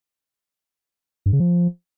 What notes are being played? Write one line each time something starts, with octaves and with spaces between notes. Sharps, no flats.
G2
C#3
F3